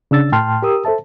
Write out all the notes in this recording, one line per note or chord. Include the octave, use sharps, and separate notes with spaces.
C#3 D4 E6 A6
A2 G5 A5 C6 F6
G4 A#4 D#6 E6
A4 C5 E5 A5